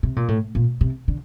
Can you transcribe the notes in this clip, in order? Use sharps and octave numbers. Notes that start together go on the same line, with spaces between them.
C3
A#2
A2
A#2
C3
D3